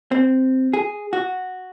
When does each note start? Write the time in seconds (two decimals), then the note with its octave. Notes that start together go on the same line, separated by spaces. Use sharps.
0.12 C4
0.73 G#4
1.13 F#4